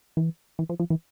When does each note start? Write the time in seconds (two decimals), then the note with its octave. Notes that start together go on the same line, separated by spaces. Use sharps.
0.17 E3
0.59 E3
0.69 F3
0.80 F3
0.90 E3